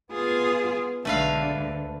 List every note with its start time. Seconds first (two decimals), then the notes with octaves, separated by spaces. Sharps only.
0.12 B3 F4 G#4
1.05 B1 D3 G#3 A3 B4 F5
1.58 D2